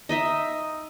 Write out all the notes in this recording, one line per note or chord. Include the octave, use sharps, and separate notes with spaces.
D#4 D#5 E5